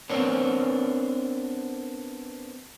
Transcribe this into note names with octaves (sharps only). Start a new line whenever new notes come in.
B3 C4 D4 A#4 C5 C#5